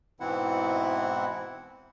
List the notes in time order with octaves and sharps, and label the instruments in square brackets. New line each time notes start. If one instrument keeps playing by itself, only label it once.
[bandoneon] G#2 B2 E3 C4 E4 F#5